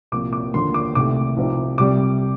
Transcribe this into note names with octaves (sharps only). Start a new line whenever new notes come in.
C2 A#2 F3 A#3 D6
D6
D#2 D3 F3 A#3 C6
D6
C2 C3 D#3 A3 D6
C2 C3 F3 C4 D#4
C2 C3 G3 D6